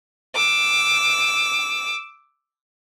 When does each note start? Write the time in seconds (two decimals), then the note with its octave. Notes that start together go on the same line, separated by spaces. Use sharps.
0.35 D6 E6